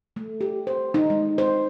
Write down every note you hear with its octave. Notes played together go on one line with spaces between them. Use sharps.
A3
G4
C5
D#4
G#3
C5